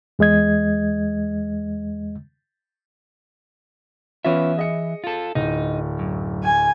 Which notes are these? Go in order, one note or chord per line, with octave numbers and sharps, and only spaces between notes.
E2 G#3 D#5 G#6
E3 B3 C#4 F4 E5
G#4 D#5 C#7
F4 A4
D1 D#4
F#2
G#5